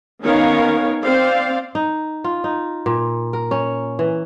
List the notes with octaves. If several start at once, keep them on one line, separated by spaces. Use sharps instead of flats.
D#3 B3 C#4 A#4 C#5 F5
C4 C5 D5 F5
D#4
F4
D#4
A#2
A#4
C#4
E3